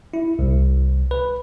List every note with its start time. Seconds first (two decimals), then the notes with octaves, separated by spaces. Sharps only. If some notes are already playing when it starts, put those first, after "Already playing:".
0.14 E4
0.39 C2
1.11 B4